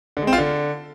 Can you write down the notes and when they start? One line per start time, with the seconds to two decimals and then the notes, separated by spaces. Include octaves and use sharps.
0.17 D3
0.22 G#3
0.27 C4
0.33 F4
0.38 D3